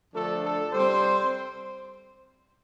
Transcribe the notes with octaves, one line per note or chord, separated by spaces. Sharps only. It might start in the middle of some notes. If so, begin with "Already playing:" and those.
D3 F3 A3 D4 A4
A4
C3 G3 C4 C5